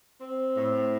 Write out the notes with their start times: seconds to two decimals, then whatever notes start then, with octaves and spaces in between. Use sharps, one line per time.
0.21 C4
0.56 A2